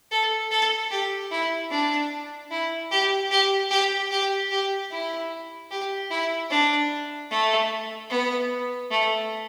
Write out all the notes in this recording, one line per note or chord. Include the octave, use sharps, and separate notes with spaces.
A4
A4
G4
E4
D4
E4
G4
G4
G4
G4
G4
E4
G4
E4
D4
A3
B3
A3